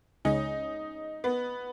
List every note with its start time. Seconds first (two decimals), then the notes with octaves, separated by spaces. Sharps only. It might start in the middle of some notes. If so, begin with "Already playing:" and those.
0.25 C#2 C#3 G#3 C#4 D#4
1.24 B3